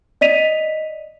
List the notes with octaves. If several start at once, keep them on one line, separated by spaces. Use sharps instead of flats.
D5 D#5 B6 D#7 F7